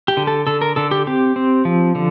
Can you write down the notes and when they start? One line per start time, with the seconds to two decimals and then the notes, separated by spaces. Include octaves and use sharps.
0.08 G4
0.17 D3
0.27 A4
0.47 D3 A4
0.62 A#4
0.76 D3 A4
0.91 G4
1.07 C4 G4
1.36 C4
1.65 F3
1.95 D3